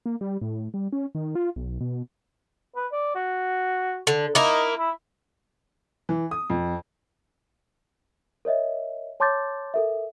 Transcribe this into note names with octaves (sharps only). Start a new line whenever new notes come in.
A#3
G3
A2
G3
C#4
D#3
F4
B1
B2
B4
D5
F#4
D3
A#3 D#4 E4
E4
E3
D#6
F2
A#4 C#5 D#5 E5
C#5 A5 C6 D6 G6 A6
A4 A#4 E5